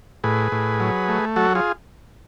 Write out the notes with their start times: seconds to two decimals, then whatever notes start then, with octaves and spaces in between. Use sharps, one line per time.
0.24 A2 G#4 B4
0.52 A2
0.80 F#3
1.08 A3
1.36 F#3 F#4 A4
1.55 F4 G#4